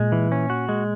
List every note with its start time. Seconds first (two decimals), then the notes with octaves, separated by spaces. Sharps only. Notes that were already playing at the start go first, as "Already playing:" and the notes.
Already playing: A#2 G#3
0.12 E3
0.32 C#4
0.50 F#4
0.69 G#3